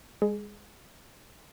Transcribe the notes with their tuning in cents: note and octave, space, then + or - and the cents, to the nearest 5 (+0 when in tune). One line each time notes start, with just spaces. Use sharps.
G#3 -25 G#4 +15